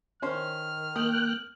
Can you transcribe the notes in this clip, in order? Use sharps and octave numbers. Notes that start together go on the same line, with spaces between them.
D#3 C#4 C5 C6 F6
A#3 G5 D#6 F#6